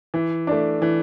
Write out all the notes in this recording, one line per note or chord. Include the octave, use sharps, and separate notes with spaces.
E3
A3 D4
E3